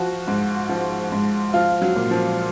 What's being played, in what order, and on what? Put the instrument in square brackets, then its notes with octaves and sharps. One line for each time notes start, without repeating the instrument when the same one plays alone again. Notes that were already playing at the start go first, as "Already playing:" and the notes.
Already playing: [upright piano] F3 F#4
G#2
F3
G#2
F3 F4
F#3
A#2
F3